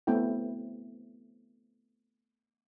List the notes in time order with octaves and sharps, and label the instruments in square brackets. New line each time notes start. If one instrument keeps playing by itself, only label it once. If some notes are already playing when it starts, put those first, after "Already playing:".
[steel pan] A3 B3 C4 E4 G5